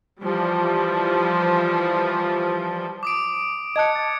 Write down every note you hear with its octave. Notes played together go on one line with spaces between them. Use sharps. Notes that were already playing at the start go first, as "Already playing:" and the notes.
E3 F3 G3
D6 D#6 D7
D#5 A5 F#6 G#6 C#7
A6